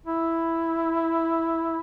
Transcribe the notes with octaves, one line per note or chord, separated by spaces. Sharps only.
E4